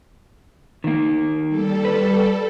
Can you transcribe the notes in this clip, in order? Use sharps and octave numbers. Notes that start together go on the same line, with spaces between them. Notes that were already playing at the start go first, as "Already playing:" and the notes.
D#3 A#3
G3 A4
B4